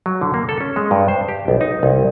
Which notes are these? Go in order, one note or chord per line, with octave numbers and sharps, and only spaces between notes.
F#3
D3
A#3
A4
C#4
G#3
G2
C5
G4
B1
D#4
C2